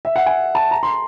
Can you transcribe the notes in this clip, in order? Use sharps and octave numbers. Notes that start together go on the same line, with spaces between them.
E5
F#5
G#5
A5
A#5
C6